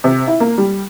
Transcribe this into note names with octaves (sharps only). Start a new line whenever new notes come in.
C3
E4
A#3
G3